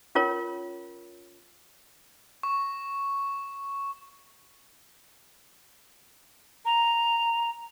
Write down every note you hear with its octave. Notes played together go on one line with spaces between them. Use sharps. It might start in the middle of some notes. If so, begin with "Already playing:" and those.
C#4 F4 A#4 C#5
C#6
A#5